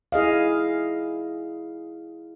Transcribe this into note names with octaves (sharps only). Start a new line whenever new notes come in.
E4 G#4 D#5 F5